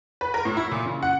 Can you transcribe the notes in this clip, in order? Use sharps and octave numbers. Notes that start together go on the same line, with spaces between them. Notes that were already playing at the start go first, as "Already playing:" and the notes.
B4
A#4
A2
E4
A#2
C#3
F#5